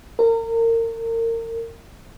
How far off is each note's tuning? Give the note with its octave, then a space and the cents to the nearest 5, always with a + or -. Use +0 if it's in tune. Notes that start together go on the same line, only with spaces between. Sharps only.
A#4 -30